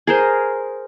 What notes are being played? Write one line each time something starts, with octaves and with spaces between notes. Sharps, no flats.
G#4 A#4 C5